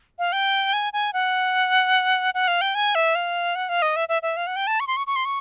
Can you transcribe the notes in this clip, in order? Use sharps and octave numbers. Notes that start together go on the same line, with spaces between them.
F5
G5
G#5
G#5
F#5
F#5
F5
G5
G#5
E5
F5
F#5
F5
D#5
E5
E5
E5
F5
F#5
G5
A5
C#6
C6
C#6
C#6
C6
C#6